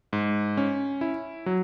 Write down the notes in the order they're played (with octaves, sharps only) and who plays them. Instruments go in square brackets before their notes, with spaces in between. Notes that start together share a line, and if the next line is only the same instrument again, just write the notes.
[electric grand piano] G#2
C#4
E4
F#3